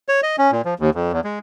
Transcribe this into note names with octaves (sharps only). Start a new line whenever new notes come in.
C#5
D#5
C#4
A#2
F3
D#2
F2
E2
G#3